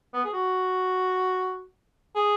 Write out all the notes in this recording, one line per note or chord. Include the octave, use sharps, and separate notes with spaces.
B3
G#4
F#4
G#4